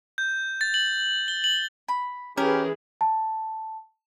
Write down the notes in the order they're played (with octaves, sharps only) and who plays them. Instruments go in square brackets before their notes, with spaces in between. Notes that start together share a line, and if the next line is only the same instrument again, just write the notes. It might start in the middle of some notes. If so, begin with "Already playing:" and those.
[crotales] G6
A6
F#7
G7
F#7
[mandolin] B5
[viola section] E3 G#4 B4 [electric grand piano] C#4 [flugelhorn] G4 [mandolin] A#4
[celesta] A5